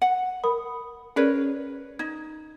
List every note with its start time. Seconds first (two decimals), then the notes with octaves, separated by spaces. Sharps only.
0.02 F#5
0.44 A#4 B5 D#6
1.16 C#4 G#4 A#4 B4 C#5 D5
1.99 D#4 G#6